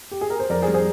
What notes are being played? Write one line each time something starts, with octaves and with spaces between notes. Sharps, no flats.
G4
G#4
A#4
C5
F2 A#4 D5
G#4 C5
G3
G#4 C5